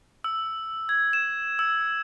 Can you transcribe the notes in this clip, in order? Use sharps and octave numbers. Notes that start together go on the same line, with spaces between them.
E6
G#6
E7
E6